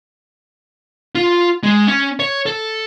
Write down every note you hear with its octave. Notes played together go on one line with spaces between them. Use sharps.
F4
G#3
C#4
C#5
A4